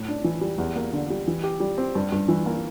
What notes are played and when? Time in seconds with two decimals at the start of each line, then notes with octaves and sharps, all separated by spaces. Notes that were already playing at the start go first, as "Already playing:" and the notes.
Already playing: A2
0.08 D4
0.24 E3
0.41 G3
0.58 E2
0.76 A#3
0.93 D3
1.10 G3
1.28 E3
1.44 G4
1.60 G3
1.78 C4
1.95 G2
2.12 G2
2.28 E3
2.46 A#3